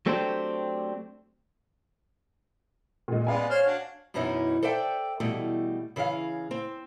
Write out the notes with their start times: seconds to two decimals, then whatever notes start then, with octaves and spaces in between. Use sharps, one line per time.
0.06 F#3 A3 C4 D4 G4 C5
3.08 A#2 G#3
3.27 G#3 B3 B4 D5 F5 G#5
3.50 C5 C#5 F6
3.66 D4 F#4
4.14 F#2 B2 E3 C#4 D#4 E4
4.63 A4 C5 D5 E5 G5
5.20 B2 E3 G3 A3
5.96 C#3 E3 G#4 F5
6.51 C4